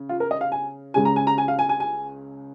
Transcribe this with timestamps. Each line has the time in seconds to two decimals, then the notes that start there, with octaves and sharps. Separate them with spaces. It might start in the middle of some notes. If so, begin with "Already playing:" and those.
Already playing: C#3
0.09 F4
0.20 A#4
0.31 D#5
0.41 F5
0.52 G#5
0.94 C#2 C#3 G#3 G#5
1.05 A#5
1.16 G#5
1.27 A#5
1.38 G#5
1.48 F5
1.59 G#5
1.69 G#5
1.80 G#5